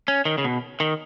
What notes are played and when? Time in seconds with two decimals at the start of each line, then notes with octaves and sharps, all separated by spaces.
0.08 C#4
0.25 D#3
0.38 C#3
0.44 B2
0.80 D#3